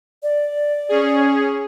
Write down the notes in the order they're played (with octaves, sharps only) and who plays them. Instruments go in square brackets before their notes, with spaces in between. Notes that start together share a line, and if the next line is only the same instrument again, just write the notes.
[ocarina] D5
[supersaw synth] C#4 G#4